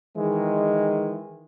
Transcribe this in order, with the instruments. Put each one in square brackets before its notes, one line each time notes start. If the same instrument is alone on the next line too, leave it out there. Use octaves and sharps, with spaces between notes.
[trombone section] D#3 E3 G#3